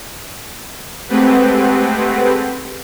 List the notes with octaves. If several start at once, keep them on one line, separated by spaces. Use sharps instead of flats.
G#3 A3 C4 G4 B4 F#5